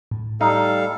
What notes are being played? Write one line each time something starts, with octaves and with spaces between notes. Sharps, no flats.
A2
G3 D#4 A4 F5